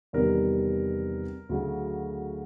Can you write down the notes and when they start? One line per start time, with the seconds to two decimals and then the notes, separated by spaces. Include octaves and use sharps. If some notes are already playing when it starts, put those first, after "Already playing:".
0.13 E2 C3 D#3 G3 A#4
1.49 D2 C#3 F#3